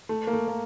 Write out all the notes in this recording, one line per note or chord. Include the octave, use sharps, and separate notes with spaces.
A3
A#3
A3
A#3